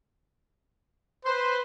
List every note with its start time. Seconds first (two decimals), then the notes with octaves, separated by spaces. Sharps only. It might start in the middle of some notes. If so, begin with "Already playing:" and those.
1.25 B4 C5